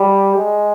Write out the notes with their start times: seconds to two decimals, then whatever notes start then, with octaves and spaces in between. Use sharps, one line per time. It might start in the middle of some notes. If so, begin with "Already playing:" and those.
Already playing: G3
0.36 G#3